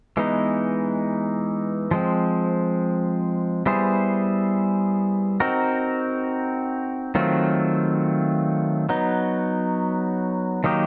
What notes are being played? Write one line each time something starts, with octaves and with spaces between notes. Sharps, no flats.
E3 G#3 B3 D#4
F3 G#3 C4
G3 B3 E4 G#4 C5
C4 D#4 F#4 A#4
D#3 F#3 A3 C4 F4
F#3 B3 D#4
D#3 F#3 A#3 D#4 G4